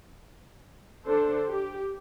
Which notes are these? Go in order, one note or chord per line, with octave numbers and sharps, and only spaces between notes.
D3 D4 A4 C5
G4